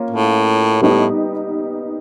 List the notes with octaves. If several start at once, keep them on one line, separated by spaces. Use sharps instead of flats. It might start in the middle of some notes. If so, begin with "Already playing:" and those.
Already playing: A#3 C#4 F4
A2
A2 G3 B3 D#4 G4